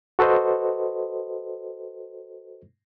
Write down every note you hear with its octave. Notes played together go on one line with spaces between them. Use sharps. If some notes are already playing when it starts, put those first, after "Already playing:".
F#4 A4 B4 C5 D#5